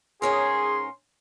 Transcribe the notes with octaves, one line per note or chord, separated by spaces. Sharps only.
G#2 C#4 G#4 A#4 C6